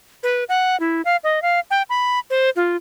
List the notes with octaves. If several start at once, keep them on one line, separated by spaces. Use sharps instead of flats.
B4
F#5
E4
F5
D#5
F5
G5
B5
C5
F4